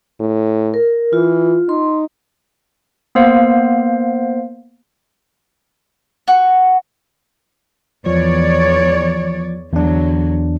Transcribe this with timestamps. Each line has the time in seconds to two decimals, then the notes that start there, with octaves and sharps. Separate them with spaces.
0.20 A2
0.74 A#4
1.13 E3 F4
1.69 D#4 C6
3.15 A#3 B3 C5 F5
6.28 F#4
8.06 E2 F3 C#5 D5
9.73 E2 D3 F#3 D4